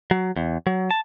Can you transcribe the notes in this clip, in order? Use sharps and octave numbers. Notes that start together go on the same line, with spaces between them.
F#3
E2
F#3
A5